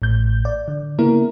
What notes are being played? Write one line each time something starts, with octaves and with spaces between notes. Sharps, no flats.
A1 A2 G6
D5
D3
C#3 A#3 B3 E4 A#4